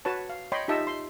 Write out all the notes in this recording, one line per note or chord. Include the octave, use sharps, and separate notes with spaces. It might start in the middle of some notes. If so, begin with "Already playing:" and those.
F#4 B4 C#5 A5
F5
C#5 D#5 G5 B5 C6
D#4 F4 G4 D#5 E5 A5
C6